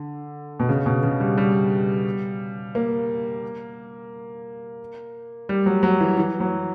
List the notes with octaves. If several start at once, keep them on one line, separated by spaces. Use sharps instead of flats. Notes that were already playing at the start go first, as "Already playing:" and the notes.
Already playing: D3
B2
C#3
B2
C#3
G3
G3
A#3
G3
F#3
F#3
E3
E3
F#3